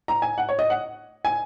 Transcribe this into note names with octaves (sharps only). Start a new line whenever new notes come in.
A#5
G#5
F#5
C#5
D#5
F#5
G#5